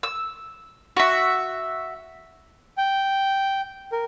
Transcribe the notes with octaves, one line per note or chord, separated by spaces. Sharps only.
E6
F#4 E5
G5
A#4